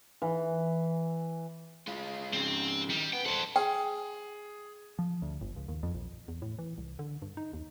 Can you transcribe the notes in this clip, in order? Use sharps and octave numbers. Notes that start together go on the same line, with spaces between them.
E3
G#3 F4
G#2 C#3 C4
D#3 G3
B3 G5
A4 A#4 C5 F#5
G#4 G5
F3
D2
G1
C#2
D#2
F2
A#1
E2
A2
E3
C2
D3
G2
D#4
D#2